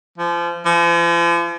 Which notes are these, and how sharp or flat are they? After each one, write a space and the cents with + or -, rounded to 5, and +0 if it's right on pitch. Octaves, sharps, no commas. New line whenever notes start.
F3 -30
F3 -40